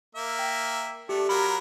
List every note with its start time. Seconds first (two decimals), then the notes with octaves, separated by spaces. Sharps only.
0.15 A#3 E5
0.39 G5
1.09 A3 D4 G4
1.29 F#3 F4 A#4 B5